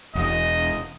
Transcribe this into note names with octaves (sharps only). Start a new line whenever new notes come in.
E1 D#5